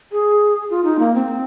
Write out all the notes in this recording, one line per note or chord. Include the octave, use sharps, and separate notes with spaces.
G#4
F4
D#4
A#3
C4